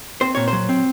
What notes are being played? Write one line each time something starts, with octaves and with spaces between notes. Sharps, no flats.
C4 C5
A#2 C#5
C5
F#3
C4